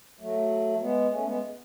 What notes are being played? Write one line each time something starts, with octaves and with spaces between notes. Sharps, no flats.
F#3 A3
G#3 B3
A3 C#4
G#3 B3